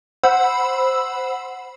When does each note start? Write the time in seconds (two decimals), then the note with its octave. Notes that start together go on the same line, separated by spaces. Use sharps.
0.23 C5 F#5 B5 E6